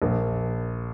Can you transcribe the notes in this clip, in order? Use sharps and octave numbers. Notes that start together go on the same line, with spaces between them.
A#1